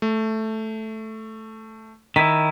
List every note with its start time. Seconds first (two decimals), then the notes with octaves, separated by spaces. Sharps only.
0.02 A3
2.16 D#3 E4 B6